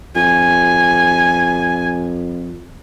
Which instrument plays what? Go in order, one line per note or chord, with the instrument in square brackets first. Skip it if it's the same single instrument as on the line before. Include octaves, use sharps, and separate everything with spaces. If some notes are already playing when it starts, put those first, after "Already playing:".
[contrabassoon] F2 [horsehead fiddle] G#5